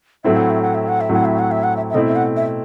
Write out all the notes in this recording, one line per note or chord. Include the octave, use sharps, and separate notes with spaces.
A2 F#3 A3 C4 E4 E5
F#5
E5
F#5
E5
F#5
E5
A2 F#3 A3 C4 E4 F#5
E5
F#5
E5
F#5
E5
E5
B2 A3 C4 E4 D#5
E5
F#5
E5